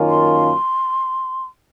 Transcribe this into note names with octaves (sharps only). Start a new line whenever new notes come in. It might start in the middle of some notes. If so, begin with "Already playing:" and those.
Already playing: F#2 D#3 A#3 C#4 F4
C6